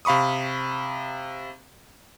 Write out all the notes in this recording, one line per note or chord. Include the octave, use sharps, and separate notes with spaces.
C3 F5 B5 C#6 D#6